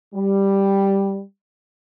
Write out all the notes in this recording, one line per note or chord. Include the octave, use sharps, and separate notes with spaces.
G3